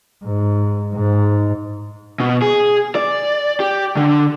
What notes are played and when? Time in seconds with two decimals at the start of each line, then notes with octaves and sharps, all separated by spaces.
0.24 G#2
0.95 G#2
2.20 B2
2.42 G#4
2.95 D5
3.60 G4
3.97 D3